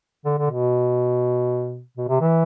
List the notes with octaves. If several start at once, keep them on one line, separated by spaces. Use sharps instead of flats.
D3
D3
B2
B2
C3
E3